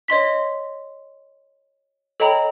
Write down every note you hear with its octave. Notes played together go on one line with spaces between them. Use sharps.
C#5 D#5 C6 B6
A4 C#5 D#5 G5 A#5 B5